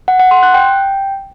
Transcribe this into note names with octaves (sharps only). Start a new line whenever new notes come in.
F#5
F#5
C6
F#6
G5